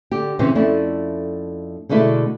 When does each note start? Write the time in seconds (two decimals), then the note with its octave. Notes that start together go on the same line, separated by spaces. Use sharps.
0.11 D3 G4
0.39 C#3 E3 C4 C#4
0.55 F2 A3 C#4 D4 E4
1.89 B2 D3 G#3 A3 E4